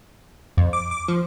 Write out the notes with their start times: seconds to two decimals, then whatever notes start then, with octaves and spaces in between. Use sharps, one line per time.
0.57 F2
0.73 D6
0.91 D6
1.08 F3